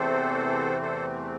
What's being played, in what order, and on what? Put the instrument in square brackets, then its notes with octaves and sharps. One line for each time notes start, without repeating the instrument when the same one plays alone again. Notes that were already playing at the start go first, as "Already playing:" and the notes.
Already playing: [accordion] E2 C3 E3 A3 C4 A4 C5
A4 C5